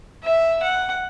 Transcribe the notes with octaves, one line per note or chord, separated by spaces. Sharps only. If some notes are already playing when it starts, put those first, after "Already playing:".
E5
F#5